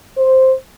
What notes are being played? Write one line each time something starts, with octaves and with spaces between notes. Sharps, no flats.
C5